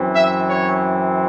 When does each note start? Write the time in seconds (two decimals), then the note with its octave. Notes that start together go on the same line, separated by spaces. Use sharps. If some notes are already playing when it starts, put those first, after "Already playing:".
Already playing: F#2 E3 C4
0.13 E5
0.48 C#5